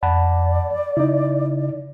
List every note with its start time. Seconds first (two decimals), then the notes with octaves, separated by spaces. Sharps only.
0.03 F2 D5 F#5 A5 B5
0.97 C#3 D#4 E4